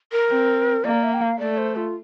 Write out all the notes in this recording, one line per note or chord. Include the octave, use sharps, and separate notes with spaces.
A#4
C4
A#3 D5
E5
G5
F5
A3 D5
C5
F4